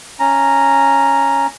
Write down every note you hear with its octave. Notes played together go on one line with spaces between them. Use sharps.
C#4 A#5